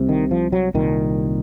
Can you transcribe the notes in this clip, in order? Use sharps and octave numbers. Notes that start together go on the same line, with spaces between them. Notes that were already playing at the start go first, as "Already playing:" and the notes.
Already playing: C2 C3
D#3
F3
F#3
C2 A#2 D#3